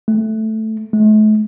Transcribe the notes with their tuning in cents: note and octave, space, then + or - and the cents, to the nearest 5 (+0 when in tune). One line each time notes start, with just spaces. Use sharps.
A3 -5
A3 -45